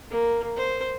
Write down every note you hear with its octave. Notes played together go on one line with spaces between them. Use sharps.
A#3
C5